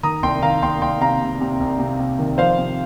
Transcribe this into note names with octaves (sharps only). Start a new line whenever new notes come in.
D#3 A#5 D#6
C2 G5 C6
D#3 F5 A#5
C2 G5 C6
C2 G5 C6
C3 F5 A#5
C3
C3
C2
C3
C3
D#3
F3 C5 F5
C3